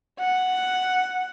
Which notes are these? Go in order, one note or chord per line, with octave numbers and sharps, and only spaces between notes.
F#5